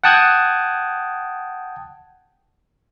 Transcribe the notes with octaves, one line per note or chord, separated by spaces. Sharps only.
F#5 G5 A5 D#6 F#6 G#6